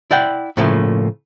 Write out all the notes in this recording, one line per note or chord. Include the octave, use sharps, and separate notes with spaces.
E4 D5 F#5 G5
A2 C#3 F3 A3 A#3